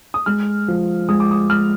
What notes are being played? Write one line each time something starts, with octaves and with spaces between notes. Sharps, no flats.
D#6
G#3 F6
F3
G#3 D#6
D6
D#6
G#3 F6